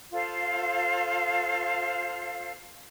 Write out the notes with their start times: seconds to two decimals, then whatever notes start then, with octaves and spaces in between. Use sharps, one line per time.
0.14 F4 A4 C5 F5